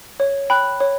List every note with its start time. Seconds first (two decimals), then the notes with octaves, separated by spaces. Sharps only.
0.20 C#5
0.50 G5 B5 F#6
0.80 C#5